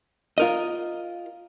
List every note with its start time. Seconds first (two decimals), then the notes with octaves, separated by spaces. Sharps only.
0.38 F4 A#4 D#5